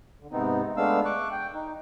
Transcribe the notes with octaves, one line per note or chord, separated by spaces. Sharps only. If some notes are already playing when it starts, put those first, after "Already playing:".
D3
G#2 C3 B3 C4 D#4
G#3 A3 B3 D4 F5 E6
C#6 D6 F#6
G5
D#4